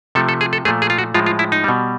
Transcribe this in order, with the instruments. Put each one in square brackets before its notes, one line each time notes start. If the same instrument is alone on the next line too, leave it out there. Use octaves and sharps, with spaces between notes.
[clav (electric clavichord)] C3 F3 A3 A4
A4
G#4
A4
A#2 F3 A3 G#4
G#4
F4
F#4
A2 F3 G#3 F4
F4
E4
D#4
B2 G3